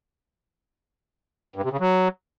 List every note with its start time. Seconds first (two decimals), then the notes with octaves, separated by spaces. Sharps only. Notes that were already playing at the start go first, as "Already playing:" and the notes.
1.56 G2
1.64 C3
1.72 C#3
1.80 F#3